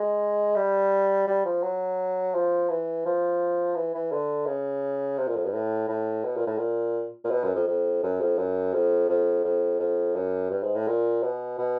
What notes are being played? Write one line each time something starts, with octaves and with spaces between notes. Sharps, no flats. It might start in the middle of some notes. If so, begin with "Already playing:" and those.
Already playing: G#3
G3
G3
F3
F#3
F3
E3
F3
E3
E3
D3
C#3
C3
A#2
F2
G2
A2
A2
B2
A#2
A2
A#2
A#2
B2
F#2
F2
F2
F#2
F2
F#2
F2
F2
F2
F2
F#2
G2
G#2
A2
A#2
B2
B2